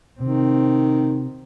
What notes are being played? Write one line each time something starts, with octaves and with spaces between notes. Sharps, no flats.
C3 D#3 C4